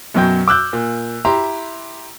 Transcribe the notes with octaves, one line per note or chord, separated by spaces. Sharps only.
F#2 B2 F#3 G5 G6
D6 E6 F#6 G6
A#2
E4 G4 A#5 C6